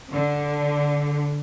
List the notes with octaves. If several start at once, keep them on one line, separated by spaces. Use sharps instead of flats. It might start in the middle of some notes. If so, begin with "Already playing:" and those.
D3